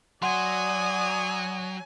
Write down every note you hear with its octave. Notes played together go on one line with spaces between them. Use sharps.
F#3 D5 F#5 G#5 C6 D#6